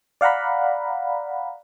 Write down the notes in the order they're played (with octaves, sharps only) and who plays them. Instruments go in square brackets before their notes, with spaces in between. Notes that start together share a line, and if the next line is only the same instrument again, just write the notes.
[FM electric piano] D5 F5 F#5 A#5 B5